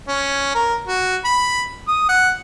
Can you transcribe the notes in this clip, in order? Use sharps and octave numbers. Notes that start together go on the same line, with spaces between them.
C#4
A#4
F#4
B5
D#6
F#5